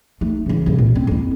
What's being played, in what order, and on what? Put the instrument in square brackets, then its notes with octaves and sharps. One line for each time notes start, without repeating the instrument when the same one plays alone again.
[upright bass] A3 D#4
C#3 E3
C2 G#2
A#2
C4
F2 E4